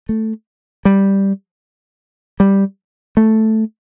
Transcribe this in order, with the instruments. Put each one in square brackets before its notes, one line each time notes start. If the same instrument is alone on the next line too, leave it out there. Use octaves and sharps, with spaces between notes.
[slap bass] A3
G3
G3
A3